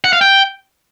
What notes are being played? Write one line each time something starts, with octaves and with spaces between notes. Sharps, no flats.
F#5
F5
G5